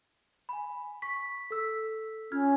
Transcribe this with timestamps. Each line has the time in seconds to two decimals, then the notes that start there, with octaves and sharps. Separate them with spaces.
0.49 G#5 B5
1.02 C#6 B6
1.51 A4 E6 B6
2.32 C#4 F4 F6 G#6